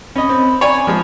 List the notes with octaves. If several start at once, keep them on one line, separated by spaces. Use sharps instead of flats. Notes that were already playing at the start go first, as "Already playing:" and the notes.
C#4 D#5 B5
C4
C#5 D5 G#5
F3 G#3